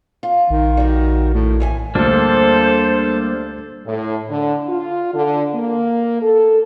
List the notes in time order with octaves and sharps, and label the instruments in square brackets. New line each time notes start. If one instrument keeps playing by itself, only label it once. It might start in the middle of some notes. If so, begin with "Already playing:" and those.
[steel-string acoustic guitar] F4
[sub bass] A#1 [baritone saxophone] D#3
[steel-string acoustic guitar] G3 F#4
[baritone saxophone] A2
[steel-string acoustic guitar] D#2 E3 G#5
[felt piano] D2 [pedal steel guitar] G3 A#3 D4 [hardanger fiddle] A4 [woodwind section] C5
[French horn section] A2
D3
F4
D3
A#3
A4